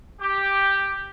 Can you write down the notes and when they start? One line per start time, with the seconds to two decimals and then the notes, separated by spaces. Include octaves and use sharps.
0.21 G4